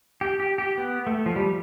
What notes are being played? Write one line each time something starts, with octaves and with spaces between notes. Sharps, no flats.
G4
G4
G4
B3
A3
F3
G3